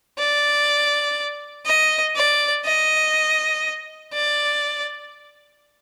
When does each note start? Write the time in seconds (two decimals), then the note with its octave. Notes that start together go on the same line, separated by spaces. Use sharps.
0.19 D5
1.66 D#5
2.16 D5
2.65 D#5
4.13 D5